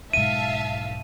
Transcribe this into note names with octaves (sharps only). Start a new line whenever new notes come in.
B1 G#2 E5 F5 A5 D#7